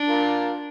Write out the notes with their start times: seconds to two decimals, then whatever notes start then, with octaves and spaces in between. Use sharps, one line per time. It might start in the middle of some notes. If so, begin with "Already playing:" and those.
Already playing: D4
0.08 F4 A#4